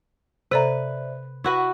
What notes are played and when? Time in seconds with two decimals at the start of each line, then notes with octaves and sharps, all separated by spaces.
0.51 C3 A4 B4 C5 D5 E5 A#5
1.44 E4 F#4 B4 C#6